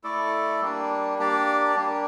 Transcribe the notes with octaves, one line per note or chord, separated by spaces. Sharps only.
A3 E4 A4 D5
G3 A#3 D4
A#3 D4 G4 D5
G3 A#3 D4